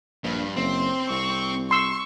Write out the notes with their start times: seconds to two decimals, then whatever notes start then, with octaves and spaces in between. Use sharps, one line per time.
0.24 A#1 G2
0.57 F#1 C4 C6
1.10 C2 C#6
1.71 C6 C#6 E6